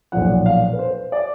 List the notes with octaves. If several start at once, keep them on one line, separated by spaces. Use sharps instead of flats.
B1 A#2 F3 F#5
F5
B4
C5
D5